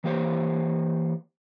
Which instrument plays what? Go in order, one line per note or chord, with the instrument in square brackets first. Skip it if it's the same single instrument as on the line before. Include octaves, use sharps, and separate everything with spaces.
[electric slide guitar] E3 A#3 G4 C5 C#5